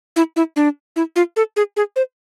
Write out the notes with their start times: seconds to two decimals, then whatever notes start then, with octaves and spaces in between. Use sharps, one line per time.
0.16 E4
0.36 E4
0.56 D4
0.96 E4
1.16 F4
1.36 A4
1.56 G#4
1.77 G#4
1.96 C5